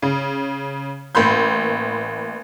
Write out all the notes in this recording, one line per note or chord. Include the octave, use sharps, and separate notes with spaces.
C#3
A1 A#3 B5 C6 G6